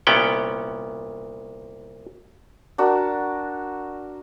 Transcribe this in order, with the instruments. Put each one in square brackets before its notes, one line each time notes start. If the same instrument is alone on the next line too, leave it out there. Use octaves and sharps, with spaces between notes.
[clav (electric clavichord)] C2 A#2 B3 C#4 G5
[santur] D4 F#4 A#4